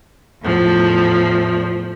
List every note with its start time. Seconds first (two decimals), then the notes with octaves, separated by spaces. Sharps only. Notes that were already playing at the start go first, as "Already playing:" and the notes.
0.42 E2 A2 F3